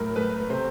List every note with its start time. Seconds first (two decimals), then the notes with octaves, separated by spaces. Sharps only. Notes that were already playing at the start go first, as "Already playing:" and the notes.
Already playing: A2 F#3 A#4
0.16 A3 B4
0.50 C3 C5